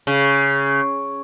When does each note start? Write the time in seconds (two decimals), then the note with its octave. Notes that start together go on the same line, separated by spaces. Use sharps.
0.07 C#3